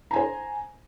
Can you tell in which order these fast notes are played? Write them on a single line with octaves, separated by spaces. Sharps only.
A#5 G#5 C5